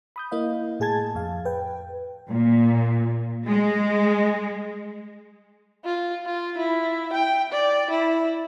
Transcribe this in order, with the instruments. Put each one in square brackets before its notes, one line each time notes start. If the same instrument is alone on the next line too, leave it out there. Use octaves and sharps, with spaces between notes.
[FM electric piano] B5 D#6 G6
A#3 E4 D#5 F5
A2 G#4 A5 G#6 A6
F2 F5
B4 G5
[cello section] A#2
G#3
[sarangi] F4
F4
E4
G5
D5
E4